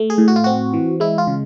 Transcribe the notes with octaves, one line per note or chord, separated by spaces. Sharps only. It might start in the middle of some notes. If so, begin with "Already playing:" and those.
Already playing: A3
G#4
A2
F#4
F4
C4 F#4
E3
G#3 E4
F4
C#3